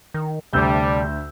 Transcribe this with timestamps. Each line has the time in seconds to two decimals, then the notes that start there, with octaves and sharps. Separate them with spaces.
0.14 D#3
0.53 D2 C3 G3 D4 E6 G6